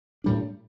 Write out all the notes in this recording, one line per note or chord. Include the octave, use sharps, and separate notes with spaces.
A2 G3 D4